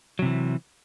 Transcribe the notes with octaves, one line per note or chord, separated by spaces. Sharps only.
C3 E3 F#3